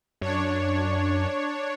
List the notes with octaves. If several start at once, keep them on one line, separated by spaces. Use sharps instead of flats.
F#2 D4 C#5